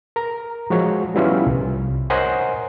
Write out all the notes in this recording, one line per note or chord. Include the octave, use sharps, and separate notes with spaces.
A#4 A#5
F3 G#3 F#4 C#5
F3 G3 B3 C#4 E4 F4
C2
A#4 C5 C#5 D#5 F#5 G#5